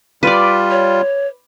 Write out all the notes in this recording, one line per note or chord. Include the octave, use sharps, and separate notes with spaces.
G3 F4 B4 D5
C#5